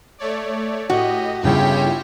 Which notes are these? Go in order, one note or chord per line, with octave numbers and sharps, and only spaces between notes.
A3 C#5 D5
A2 F#4 G4 D#5
G1 C#3 E4 F4 G4 C#5 G5